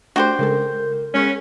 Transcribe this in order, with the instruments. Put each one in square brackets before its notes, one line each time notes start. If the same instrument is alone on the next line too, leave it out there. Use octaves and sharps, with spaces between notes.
[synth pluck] A3 D4 [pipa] F#4 G4 C5
[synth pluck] C#3 G#3 A4 [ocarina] A#4
[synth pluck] G#3 G#4 [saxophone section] B3 C#4